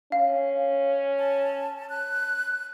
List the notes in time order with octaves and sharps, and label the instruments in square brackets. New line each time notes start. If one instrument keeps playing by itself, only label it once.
[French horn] C#4 [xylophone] F5
[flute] A5
F#6